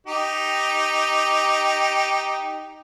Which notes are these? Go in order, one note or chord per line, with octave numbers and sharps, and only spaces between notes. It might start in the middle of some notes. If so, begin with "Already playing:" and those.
D#4 G4